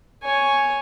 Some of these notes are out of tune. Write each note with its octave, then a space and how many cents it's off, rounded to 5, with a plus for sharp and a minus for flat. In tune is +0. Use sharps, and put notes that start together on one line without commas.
C#5 +0 G#5 +0